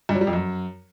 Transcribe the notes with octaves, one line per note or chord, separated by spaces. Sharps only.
G2
F#3
G3
F2
F#2